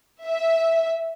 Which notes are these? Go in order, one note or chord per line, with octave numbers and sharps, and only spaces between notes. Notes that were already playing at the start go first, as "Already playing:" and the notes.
E5